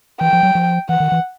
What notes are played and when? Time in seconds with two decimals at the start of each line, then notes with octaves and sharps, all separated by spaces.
0.21 E3 G5
0.33 F3
0.43 F#3
0.55 F3
0.89 E3 F#5
1.00 D#3
1.12 E3